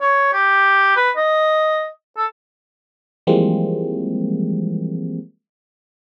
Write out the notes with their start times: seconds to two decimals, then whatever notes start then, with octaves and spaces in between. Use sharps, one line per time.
0.01 C#5
0.33 G4
0.96 B4
1.17 D#5
2.17 A4
3.27 E3 F3 G3 G#3 A#3 C4